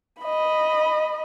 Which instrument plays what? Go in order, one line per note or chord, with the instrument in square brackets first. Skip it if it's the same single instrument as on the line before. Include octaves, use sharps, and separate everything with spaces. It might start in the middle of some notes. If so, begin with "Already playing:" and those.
[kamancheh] D#5 B5